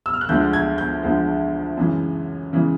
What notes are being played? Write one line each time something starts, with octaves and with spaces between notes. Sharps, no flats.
E6
F6
F#6
D2 D3 F3 G#3 G6
G#6
G6
D2 D3 F3 G#3
F#2 C#3 E3 G#3
C#3 E3 G#3